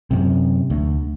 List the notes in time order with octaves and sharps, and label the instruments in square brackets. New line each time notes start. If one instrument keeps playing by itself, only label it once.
[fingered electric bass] F#2 C3
D2